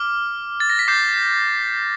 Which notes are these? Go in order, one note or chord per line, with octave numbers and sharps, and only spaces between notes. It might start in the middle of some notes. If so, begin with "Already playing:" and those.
Already playing: D6 F6
A6
A#6
B6
D6 G6 C7